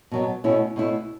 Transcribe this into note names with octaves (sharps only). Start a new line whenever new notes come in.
B2 F#3 B3
B2 A3 C#4 E4
B2 A3 C#4 E4